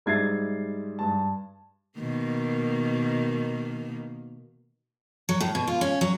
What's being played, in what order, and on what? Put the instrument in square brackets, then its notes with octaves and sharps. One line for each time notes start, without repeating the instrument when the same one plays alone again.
[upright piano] G#2 G#6 C7 [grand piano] G3 E5 A6
[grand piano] G2 A5
[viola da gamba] B2 D#3 A#3
[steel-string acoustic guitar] F#3
A2
B2
F4
C#4
F#3